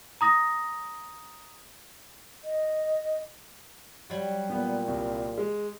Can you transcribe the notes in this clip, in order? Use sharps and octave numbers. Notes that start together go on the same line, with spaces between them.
A#5 D#6 A#6
D#5
F#3 G3
A#2 B3
C2
G#3